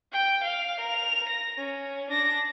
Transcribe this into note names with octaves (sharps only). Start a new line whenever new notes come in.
G5
F5 F7
A#4 F7
A#6
C#4
D4 A#6